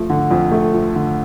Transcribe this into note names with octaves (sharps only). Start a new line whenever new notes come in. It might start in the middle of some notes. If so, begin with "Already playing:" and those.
Already playing: F3 A3
D3
F2
A3
F3
D3